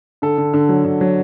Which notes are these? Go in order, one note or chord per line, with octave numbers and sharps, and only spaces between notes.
D3 A4
D3
D3
F#3
D3
F#3